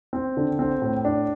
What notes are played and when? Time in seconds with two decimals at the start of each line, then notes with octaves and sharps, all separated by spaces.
0.13 C4
0.37 D3
0.59 C4
0.82 A2
1.05 D4